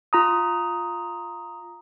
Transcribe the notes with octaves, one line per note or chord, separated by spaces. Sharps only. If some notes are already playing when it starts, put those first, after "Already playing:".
F4 A#5 D#6